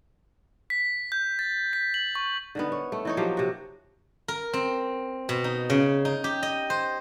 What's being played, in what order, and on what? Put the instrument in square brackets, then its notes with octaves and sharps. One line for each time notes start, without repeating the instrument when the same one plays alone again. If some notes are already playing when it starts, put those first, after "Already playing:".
[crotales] B6
G6
A6
B6
F#7
C#6
[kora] D3 D#3 B3
C#5
A3
E3 D#4 C#5
F3 F#3 A#3 G4
C3 F#4
[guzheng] A#4
C4
B2
D#4
C#3
D#4
G4
D#5
C5